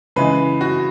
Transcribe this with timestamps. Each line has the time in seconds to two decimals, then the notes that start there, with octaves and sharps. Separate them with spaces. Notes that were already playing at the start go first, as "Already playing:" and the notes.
0.16 C#3 E3 G#3 B4
0.61 F#4